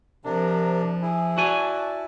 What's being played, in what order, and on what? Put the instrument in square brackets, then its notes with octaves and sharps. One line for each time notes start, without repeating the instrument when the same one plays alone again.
[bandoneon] C3 D4 [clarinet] F3 [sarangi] A#4
[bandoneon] E4 [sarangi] G#4
[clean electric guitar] F#4 G#5 [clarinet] D5 [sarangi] A5